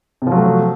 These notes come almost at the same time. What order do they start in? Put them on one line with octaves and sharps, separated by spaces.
C3 F3 F#3 A3